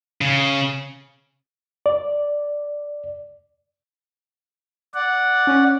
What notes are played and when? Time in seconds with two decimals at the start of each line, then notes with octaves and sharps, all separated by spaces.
0.21 C#3
1.86 D5
4.94 D5 F#5
5.47 C#4